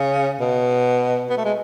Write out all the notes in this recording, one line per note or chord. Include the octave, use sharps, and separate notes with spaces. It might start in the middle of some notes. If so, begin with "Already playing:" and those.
Already playing: C#3
B2
B3
A3
G#3